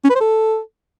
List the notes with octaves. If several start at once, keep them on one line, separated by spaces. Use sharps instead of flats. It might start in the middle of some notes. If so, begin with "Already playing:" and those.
C#4
B4
C5
A4